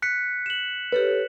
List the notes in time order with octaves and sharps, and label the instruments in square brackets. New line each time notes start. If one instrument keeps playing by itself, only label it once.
[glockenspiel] F#6 B6 C#7
E7 F#7
[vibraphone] G4 A4 C#5 [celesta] B4